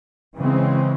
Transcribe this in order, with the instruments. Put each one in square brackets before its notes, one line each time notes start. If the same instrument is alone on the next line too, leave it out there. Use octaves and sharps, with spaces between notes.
[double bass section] C#3 E3 G#3 C4